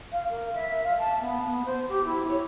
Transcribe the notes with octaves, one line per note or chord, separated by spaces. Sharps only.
F5
A#4
E5
F5
A5
B3
B3
C5
G4
E4
C#5